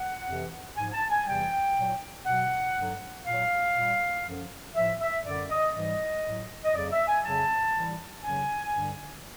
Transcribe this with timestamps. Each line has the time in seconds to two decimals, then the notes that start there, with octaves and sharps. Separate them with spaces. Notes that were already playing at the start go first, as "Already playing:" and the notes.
Already playing: F#5
0.27 F2 C3 E3
0.77 G#2 F3 G#5
0.93 A5
1.10 G#5
1.26 E2 C3 E3 G3 G5
1.76 A#2 F#3
2.26 B2 F#3 F#5
2.76 G2 D3 F#3
3.26 A#2 F#3 F5
3.75 A#2 G3
4.26 F#2 D3 F3
4.75 A2 F3 E5
5.01 E5
5.25 F#2 D3 G3 D5
5.50 D#5
5.75 G#2 E3 G3 D#5
6.25 A2 F#3
6.65 D#5
6.75 F2 C#3 F#3 D5
6.92 E5
7.08 G#5
7.25 F2 C#3 F#3 A5
7.75 A2 E3 G3
8.24 F#2 C#3 F#3 G#5
8.74 G2 D3 G3